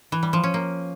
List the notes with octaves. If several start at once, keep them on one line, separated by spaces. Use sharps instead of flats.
E3
G3
F3
C#4
A#3